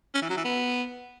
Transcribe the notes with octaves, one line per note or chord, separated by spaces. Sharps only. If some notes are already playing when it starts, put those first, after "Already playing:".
C#4
E3
F#3
E3
B3